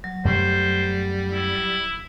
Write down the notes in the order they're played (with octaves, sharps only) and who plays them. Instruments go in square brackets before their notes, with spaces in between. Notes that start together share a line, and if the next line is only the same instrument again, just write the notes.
[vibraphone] F#3
[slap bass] F#2 A3 [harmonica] G3 [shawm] C5
[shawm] E4